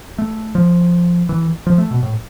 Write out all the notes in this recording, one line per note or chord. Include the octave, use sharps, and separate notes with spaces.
A3
F3
E3
F3
A3
B2
A2